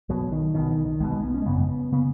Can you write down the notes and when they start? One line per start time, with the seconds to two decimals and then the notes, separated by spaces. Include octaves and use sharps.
0.09 B1 B2 F#3
0.32 D#3
0.54 B1 B2 D#3
0.70 D#3
0.85 D#3
1.00 B1 G#3
1.03 B2
1.11 G#3
1.23 B3
1.34 C#4
1.42 G#3
1.46 G#1 F#2 C#3 B3
1.92 C#3 B3